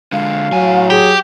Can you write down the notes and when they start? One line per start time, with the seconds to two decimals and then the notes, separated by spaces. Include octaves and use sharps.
0.12 D3 G#3 F5
0.52 A2 F#3 G#5
0.90 G4 G#4